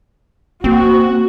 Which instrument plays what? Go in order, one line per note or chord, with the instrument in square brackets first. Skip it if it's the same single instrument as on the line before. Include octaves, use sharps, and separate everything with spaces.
[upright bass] A#3 [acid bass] C4 [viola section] F#4